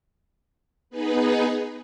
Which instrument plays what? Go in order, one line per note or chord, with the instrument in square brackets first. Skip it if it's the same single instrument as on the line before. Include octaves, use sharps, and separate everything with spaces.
[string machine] B3 D#4 G#4 B4